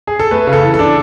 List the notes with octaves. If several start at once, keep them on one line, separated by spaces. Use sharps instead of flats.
G#4
A4
A3 B4
C#3
A4
E3
A4
D4